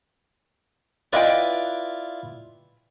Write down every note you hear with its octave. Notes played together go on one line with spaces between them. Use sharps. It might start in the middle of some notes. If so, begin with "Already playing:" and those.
E4 F4 B4 D5 D#5 G5